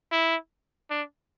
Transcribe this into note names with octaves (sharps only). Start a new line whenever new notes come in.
E4
D4